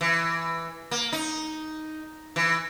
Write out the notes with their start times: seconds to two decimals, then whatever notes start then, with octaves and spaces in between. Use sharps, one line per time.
0.01 E3
0.91 A#3
1.13 D#4
2.36 E3